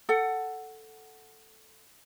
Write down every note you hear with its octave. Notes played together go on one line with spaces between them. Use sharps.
A4 F#5